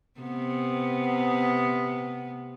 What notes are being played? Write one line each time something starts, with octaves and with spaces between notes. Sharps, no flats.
C3 B3